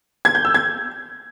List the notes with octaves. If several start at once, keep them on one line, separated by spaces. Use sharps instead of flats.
G#6
G6
E6
G#6